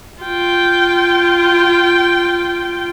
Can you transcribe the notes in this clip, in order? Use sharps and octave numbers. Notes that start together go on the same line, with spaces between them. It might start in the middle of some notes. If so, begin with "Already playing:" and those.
F4 G5